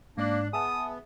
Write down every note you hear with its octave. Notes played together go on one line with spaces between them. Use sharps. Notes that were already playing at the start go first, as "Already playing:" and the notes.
G#2 A#3 D4 D5 F#6
B3 G#4 E5 A5 D#6